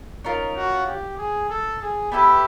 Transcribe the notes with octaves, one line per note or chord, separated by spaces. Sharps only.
C#4 D#4 F4 A#4
F#4
G4
G#4
A4
G#4
B3 E4 G4 A4